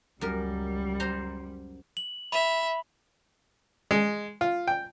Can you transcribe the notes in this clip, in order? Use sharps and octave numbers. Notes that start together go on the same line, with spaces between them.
C#2 F#2 G3 A#4
C5 A#5 C6
F#7
E5 B5
G#3
F4
G5